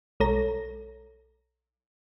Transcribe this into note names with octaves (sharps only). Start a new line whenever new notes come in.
B1 G#3 A4 C#5 A#5 A#6